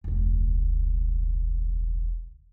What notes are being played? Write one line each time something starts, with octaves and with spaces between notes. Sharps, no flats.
E1 C#2